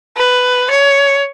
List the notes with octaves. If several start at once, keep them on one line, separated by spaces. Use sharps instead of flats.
B4
C#5